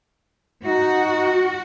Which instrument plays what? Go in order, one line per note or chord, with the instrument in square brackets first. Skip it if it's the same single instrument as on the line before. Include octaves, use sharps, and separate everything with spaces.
[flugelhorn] D#4 [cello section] F#4